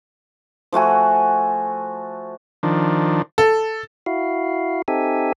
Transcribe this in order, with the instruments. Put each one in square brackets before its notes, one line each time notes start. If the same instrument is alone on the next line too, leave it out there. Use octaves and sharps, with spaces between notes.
[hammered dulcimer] F3 A3 F#4 G#5
[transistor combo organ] D#3 F3 D4
[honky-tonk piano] A4
[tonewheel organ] E4 F#4 F5
C4 D#4 G4 A4 E5 G#5